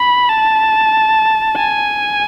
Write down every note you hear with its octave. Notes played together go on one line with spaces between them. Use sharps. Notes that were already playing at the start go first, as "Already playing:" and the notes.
Already playing: B5
A5
G#5